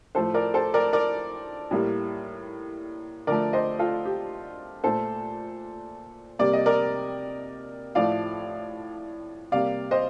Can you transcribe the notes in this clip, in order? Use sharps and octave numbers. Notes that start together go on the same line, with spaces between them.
A2 F3 A3 A4 C5
A#4 D5
A4 C5
A#4 D5
A#4 D5
A2 G3 A#3
D3 F3 A3 A#4 D5
C5 D#5
F4 A4
G4
A#2 A3 A4 C5
C3 G3 A#3 D5
D#5
A#4 D5
A2 F3 A3 D5 F5
C3 G3 A#3 D5 F5
C5 D#5